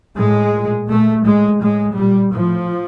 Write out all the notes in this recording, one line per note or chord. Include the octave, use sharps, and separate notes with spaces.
A2 G#3
A#2
A#2 A3
A2 G#3
A2 G#3
A#2 G3
A2 F3